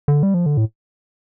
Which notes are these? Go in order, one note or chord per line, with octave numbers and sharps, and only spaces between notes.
D3
G3
F3
D3
A2